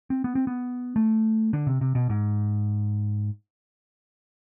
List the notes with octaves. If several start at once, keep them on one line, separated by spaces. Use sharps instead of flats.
C4
B3
C4
B3
A3
D3
C3
C3
B2
G#2